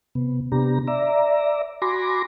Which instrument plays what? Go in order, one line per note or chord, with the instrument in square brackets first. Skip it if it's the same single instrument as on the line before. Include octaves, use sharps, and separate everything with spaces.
[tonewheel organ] C3 B3
C3 B3 D4 G4 A#5
D5 E5 A#5
F#4 G#5 B5 C6 D6 A#6